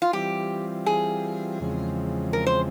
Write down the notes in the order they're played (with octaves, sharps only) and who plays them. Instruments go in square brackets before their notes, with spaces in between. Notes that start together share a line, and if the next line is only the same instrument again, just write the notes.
[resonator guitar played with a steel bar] F4
[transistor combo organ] E3 G3 C4 F4 [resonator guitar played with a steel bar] G4
[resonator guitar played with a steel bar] G#4
[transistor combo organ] E2 C#3 F3 G#3 C4
[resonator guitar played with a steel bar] A#4
C5